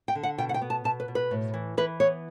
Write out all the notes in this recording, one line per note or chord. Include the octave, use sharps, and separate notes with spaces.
G5
D3
F#5
B2 G5
F#5
G5
B3
A5
B2 A5
B4
B2
B4
A2
E3
E3 B4
B3 C#5